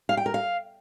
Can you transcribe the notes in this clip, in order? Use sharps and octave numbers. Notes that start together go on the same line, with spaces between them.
F5
G5
A#4
F5